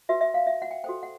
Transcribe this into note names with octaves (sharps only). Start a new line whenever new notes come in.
F#4 B4 E5
E5
F5
E5
F#5
G5
F#4 A4 C5 G5
F#5